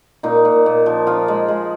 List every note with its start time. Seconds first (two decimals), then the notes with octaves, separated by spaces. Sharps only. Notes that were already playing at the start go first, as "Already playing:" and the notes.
0.23 A#2 D#4
0.45 A#2
0.66 A#2
0.86 F3
1.07 F3 F4
1.28 G#3
1.48 G#3